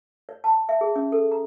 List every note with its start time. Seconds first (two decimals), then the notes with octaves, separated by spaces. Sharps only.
0.29 C#5
0.44 A5
0.69 E5
0.81 G#4
0.96 C#4
1.12 A4
1.32 A#5